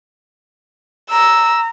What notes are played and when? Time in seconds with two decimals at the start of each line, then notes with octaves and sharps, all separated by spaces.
1.11 A#5 E6